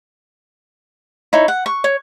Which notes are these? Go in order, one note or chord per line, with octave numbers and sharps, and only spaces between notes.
D#4 E4 C#5
F#5
C#6
C#5